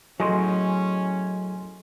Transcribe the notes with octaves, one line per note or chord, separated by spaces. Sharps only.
A2 F#3 G#3 C#4 D#5 G#5 C6